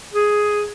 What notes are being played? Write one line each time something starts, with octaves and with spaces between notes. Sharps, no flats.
G#4